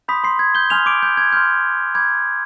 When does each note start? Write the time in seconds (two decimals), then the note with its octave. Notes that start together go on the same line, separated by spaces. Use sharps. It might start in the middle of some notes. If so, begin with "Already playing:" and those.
0.08 B5 C6 D#6 G6 B6
0.24 C6 C7
0.39 G#6
0.55 G6 G7
0.70 G#5 C6 D#6 F6 G6 F7
0.86 D6 D7
1.03 G6
1.17 G#6
1.32 C6 F6 G6
1.95 B5 D6 G6 G#6